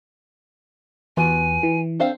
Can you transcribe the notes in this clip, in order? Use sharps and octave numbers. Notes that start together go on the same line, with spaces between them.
E2 F4 F#4 B4 G#5
E3
C4 D4 A4 C5 F5